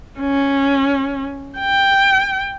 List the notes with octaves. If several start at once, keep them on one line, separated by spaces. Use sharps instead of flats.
C#4
G5